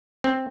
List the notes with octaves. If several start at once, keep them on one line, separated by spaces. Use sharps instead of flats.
C4